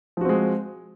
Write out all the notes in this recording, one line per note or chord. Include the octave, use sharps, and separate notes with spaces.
F3 G#3 C4 F#4